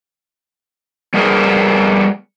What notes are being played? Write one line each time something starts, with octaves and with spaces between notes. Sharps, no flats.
G3 A3 B3 G#4 A#4 C5